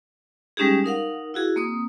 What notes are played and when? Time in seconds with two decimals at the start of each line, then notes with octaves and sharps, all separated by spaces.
0.57 G3 G#3 C#4 D#4 G4 G#4
0.84 D#4 A#4 F5 F#5
1.34 E4 F#4 G#4
1.56 A#3 C4 D#6